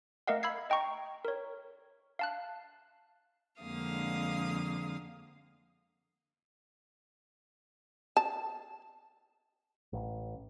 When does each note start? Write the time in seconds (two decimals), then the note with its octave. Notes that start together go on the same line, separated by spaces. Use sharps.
0.27 A3 A#4 D#5 F5 F#5
0.43 B5 E6 G#6 C7
0.70 D#5 G5 A#5 C#6
1.25 A#4 C#5
2.19 F5 A5 F#6
3.61 F2 D3 G#3 A#3 F5 D#6
8.17 A5
9.93 A1